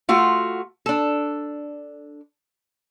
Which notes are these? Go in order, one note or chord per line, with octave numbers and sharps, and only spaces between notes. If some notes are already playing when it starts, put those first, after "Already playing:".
A3 F4 F#4
D4 A4